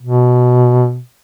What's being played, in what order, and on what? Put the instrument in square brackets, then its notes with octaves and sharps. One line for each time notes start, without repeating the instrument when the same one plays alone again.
[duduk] B2